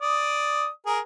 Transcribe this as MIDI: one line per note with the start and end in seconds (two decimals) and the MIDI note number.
0.01 0.68 74
0.01 0.68 87
0.86 1.00 68
0.86 1.00 70